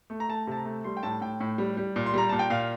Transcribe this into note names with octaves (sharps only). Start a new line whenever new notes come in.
A3
A#5
A3 A5
C3 A5
A#5
A3
G3 C6
G5
A2 A5
A2 G5
A2
G3
G3
A#2
C6
G3 A#5
A#2 A5
G5
A#2 F5